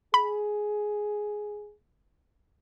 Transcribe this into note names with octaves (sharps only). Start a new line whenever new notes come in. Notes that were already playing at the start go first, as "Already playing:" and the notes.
G#4 B5